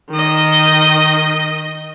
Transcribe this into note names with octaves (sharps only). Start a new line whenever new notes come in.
D#3 D#5